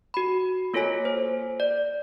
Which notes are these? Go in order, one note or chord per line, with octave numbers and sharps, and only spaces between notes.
F#4 B5
A#3 F4 A4 C#5 G#5 B6
C5
D5